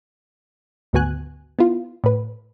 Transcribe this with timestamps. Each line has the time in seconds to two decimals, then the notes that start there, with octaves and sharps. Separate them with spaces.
0.93 G#1 D2 B3 F#4 G#5 F#6
1.59 B3 E4 F4
2.04 A2 B4